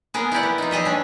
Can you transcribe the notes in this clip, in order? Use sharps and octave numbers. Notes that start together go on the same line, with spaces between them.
B3 G#4 A#4
E4 G4 D5 F#5
B3
D#4 F4
G3 G#4 D#5 E5
C#4 D4